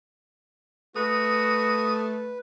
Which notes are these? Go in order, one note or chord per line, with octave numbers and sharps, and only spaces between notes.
A3 F#4 B4 D#6